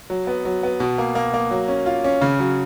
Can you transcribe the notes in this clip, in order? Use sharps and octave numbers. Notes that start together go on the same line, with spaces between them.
F#3
B3
F#3
B3
B2
A#3
A#3
A#3
F#3
C#4
F4
C#4
C#3
F#3